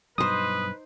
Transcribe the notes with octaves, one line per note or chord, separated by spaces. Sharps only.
G2 B2 F#3 D#4 B4 C5 D#6